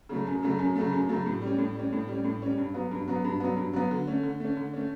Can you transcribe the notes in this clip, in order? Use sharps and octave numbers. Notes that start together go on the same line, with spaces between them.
C#3 F#3 A3
F#2
C#3 F#3 A3
F#2
C#3 F#3 A3
F#2
C#3 F#3 A3
A2
G3 C#4
A2
G3 C#4
A2
G3 C#4
A2
G3 C#4
G2
F#3 B3
G2
F#3 B3
G2
F#3 B3
G2
F#3 B3
D3
A3 C#4
D3
A3 C#4
D3
A3 C#4